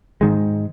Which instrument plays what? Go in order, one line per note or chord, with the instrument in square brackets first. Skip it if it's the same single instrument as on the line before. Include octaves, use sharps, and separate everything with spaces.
[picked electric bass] G#2 D#3 G#3